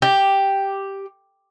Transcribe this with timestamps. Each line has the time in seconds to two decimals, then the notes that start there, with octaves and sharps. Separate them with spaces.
0.02 G4